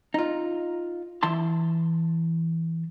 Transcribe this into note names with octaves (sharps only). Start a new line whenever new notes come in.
D#4 F4
E3 E4 A5 C6